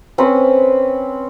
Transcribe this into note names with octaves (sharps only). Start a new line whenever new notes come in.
C4 C#4 B4